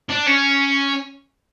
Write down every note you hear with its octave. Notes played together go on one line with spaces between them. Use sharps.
D4
C#4